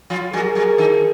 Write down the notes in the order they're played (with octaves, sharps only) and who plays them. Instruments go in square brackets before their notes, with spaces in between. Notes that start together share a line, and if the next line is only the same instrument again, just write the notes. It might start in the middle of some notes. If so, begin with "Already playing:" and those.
[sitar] F3 F4
[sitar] F#3 F#4 [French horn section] G#4 A#4
[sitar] F#3 F#4
D#3 D#4